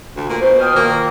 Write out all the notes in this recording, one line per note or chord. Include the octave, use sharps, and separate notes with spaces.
D2
A#2
B2 C5
G5 D#6 F6
A#2 D#3 A#3